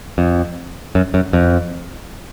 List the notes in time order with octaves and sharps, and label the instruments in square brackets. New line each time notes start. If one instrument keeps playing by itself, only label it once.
[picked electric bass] F2
F#2
F#2
F2